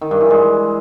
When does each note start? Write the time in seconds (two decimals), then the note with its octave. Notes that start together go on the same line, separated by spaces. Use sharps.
0.01 D#3
0.11 G2
0.21 E3
0.30 G#3